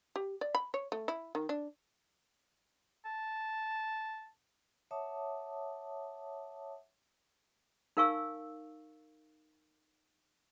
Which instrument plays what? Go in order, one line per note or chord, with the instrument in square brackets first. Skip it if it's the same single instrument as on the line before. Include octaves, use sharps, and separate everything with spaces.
[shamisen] G4
D5
B5
C#5
A3
E4
D#3
D4
[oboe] A5
[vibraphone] C#5 E5 F#5 A5 D6 D#6
[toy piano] D#4 A#4 F5 G#5 C#6 E6